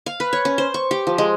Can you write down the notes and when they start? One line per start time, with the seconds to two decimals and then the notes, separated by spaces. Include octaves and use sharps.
0.06 F5
0.20 B4
0.33 C#5
0.45 C#4
0.58 C5
0.74 C#6
0.91 G4
1.07 F3
1.18 G#3